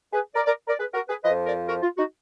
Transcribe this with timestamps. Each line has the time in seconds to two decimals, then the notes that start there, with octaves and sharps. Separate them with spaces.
0.13 G#4 B4
0.35 A#4 D5
0.46 A#4 D5
0.68 A#4 D5
0.79 G#4 B4
0.94 F#4 A#4
1.09 G#4 B4
1.23 F3 B4 D#5
1.27 F2
1.46 A#4 D5
1.68 F#4 A#4
1.82 F4
1.97 D#4 F#4